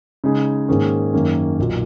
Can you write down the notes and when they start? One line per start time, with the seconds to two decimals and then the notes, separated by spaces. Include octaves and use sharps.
0.24 C#3 G#3 D#4 G#4
0.68 G#2 D#3 A#3 C#4 G#4
1.13 F#2 D#3 A#3 C#4
1.59 B1 A#2 F#3